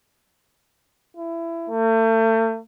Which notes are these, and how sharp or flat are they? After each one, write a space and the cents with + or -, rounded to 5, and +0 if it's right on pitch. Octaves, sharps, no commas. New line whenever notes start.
E4 +20
A3 +35